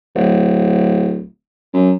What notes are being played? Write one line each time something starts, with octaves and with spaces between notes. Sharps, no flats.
D1
F#2